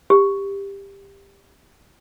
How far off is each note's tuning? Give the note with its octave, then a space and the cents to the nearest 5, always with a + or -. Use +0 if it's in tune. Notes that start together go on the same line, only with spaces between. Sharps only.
G4 +15